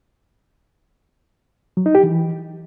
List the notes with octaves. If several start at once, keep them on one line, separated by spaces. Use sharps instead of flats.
F#3
D#4
G4
E3